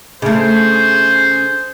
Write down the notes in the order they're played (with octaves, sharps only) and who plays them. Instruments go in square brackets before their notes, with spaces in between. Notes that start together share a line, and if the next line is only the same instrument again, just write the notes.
[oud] C#3 A3 [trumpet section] G#4 C5